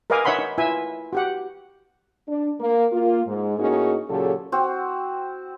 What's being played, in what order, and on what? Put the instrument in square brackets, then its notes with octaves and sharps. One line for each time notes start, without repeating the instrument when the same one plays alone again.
[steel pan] A#4 B4 D#5 F5 G#5 D6
D#4 C#5 E5 F#5 B5 C6
D#4
E4 F4 B4 E5 G#5
F#4 G4 F#5
[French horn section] D4
A#3
A#3 F4
G#2
A2 A#3 C#4 D#4 F#4 G#4
A#2 C#3 F#3 G4 A4
[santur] C4 F#4